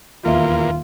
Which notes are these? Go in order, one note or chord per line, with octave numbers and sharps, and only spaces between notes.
D#1 E2 A#3 F4 E5